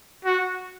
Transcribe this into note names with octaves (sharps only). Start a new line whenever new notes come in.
F#4